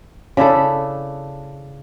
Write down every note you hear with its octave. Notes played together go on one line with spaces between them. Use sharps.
C#3 D4 E4 A4